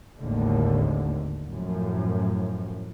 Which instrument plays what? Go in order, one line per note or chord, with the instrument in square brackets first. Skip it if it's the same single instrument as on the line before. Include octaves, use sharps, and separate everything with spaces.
[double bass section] G#1 D#2 A2 D3
F#2 A2 F3